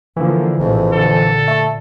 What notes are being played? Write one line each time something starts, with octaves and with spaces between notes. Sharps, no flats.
D3 E3 F3 A#3
A#1 F2 A2 C3
A#2 D3 A4
A3